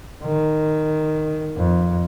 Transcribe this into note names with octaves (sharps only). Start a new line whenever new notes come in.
D#3
F2